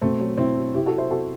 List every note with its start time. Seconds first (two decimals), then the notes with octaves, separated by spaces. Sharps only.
0.01 B2 A3 C4
0.20 F#3
0.38 B2 C4 E4
0.56 F#3
0.74 C3 E4 G4
0.86 F#4 A4
0.93 F#3
0.98 C5 E5
1.10 C3 F#4 A4